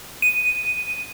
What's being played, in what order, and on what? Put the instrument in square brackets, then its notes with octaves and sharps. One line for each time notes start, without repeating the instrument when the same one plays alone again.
[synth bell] D#7